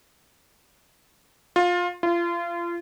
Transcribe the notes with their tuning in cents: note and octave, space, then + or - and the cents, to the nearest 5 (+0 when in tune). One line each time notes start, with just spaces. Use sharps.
F4 +20
F4 -30